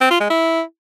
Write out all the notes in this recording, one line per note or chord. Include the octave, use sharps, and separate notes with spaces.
C4
F4
G#3
E4